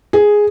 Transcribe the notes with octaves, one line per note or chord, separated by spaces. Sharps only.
G#4